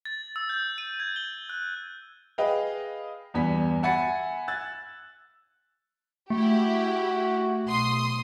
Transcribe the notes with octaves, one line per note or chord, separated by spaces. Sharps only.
A6
E6
G6
D#7
G#6
G7
F#6
G#4 B4 D#5 F5 G5
E2 G2 B3 G#5 B6
E5 F#5 G#5 B5 A6 C#7
E6 F#6 G#6 A6
A3 E4 F#4 G4
B1 C6 D#6